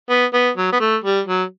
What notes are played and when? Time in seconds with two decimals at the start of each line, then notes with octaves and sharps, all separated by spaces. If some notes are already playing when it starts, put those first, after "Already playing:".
0.09 B3
0.33 B3
0.57 F#3
0.72 B3
0.80 A3
1.04 G3
1.27 F#3